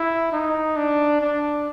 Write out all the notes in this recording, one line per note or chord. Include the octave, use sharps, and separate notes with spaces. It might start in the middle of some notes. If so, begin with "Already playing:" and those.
Already playing: E4
D#4
D4
D4